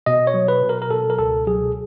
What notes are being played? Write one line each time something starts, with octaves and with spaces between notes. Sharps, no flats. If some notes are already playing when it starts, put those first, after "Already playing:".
B2 D#5
C#5
F#3
B4
B2
A#4
A#4
B2 A4
A#4
C#2 A4
F#3 G#4